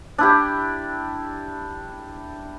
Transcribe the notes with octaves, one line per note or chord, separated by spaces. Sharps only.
D4 E4 G4